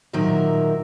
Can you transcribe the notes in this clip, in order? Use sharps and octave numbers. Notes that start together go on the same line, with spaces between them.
A#2 D#3 F#3 A#4 E5